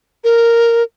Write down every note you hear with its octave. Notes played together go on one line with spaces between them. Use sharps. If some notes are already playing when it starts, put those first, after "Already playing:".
A#4